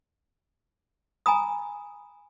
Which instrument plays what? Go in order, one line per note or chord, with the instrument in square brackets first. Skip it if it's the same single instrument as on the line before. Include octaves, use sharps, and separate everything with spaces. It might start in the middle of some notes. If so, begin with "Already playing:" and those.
[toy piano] G#5 A#5 B5 D#6